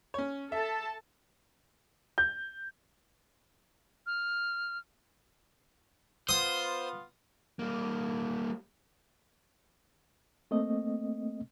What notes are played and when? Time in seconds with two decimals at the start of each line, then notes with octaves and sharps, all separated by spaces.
0.14 C#4 C#5
0.52 A4 E5 A5
2.18 G6
4.06 F6
6.29 B3 F4 C5 D#6
7.59 G3 A#3
10.51 A3 A#3 C4 D#5